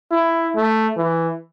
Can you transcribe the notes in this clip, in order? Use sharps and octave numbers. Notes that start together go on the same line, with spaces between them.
E4
A3
E3